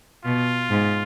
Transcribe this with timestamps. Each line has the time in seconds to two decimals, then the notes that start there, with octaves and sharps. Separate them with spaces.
0.24 B2 F4
0.70 G#2